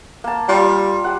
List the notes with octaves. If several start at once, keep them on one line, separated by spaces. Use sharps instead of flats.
A#3 A5
G3 F4
G3 F#5